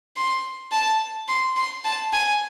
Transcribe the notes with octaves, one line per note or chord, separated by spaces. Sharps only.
C6
A5
C6
C6
A5
G#5